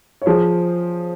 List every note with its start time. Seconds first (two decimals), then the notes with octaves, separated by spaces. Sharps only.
0.22 C#5
0.26 F3 G#4 C5